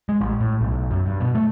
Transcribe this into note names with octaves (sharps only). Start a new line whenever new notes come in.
G#3
A1
A2
B1
F#2
G2
B2
A3